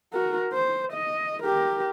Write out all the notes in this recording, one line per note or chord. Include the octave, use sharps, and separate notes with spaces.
F#4 A#4
C5
D#5
G4 A#4